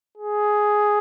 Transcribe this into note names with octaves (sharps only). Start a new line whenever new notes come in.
G#4